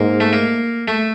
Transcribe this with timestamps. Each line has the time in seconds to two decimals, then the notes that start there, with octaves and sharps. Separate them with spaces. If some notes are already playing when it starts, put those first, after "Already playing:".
Already playing: G#2 A#3
0.20 A3
0.33 A#3
0.88 A3